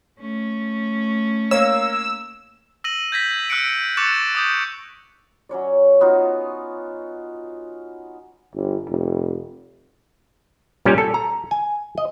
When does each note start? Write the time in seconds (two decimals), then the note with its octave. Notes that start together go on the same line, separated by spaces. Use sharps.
0.19 A3 C#4
1.51 A#3 C#5 E6
2.84 E6 A#6 D#7 F#7
3.12 G6 G#6 A#6 B6
3.50 E6 F#6 B6 C#7 D7
3.97 C#6 D6 F#6 A6 C#7 E7
4.35 D6 D#6 G6
5.49 F#3 C#4 C#5 D5
6.01 B3 D#4 F4 F#4
8.55 G1
8.88 F1
10.85 A#2 G3 C#4
10.98 A4
11.14 A#5
11.51 G#5
11.98 D#5